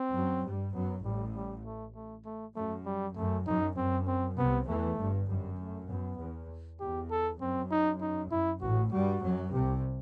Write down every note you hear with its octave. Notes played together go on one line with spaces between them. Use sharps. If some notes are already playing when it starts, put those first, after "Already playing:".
Already playing: C4
F#2 F#3
G2 G3
F#2 F#3 B3
A1 A2 G3
G3
A3
A3
A3
F#2 A3
G3
F#2 A3
F#2 D#4
F#2 C4
C4
C2 C3 B3
E2 E3 A3
G1 G2
F#2 G3
A3
F#2 B3
E2
E2 G4
A4
F#2 C4
D#4
D#4
F#2 E4
A1 A2 F#4
G2 G3 F#4
F#2 F#3
C2 C3 G4